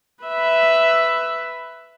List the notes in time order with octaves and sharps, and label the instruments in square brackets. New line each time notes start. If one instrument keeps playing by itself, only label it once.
[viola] B4 E5